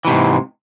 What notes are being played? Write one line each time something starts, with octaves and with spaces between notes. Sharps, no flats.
G#2 C3 E3